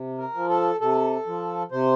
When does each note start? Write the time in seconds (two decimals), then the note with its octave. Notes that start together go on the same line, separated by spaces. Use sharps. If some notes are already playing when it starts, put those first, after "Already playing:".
Already playing: C3
0.18 A#4
0.34 F3
0.49 A4
0.80 C3 A4
1.26 F3
1.71 C3 C5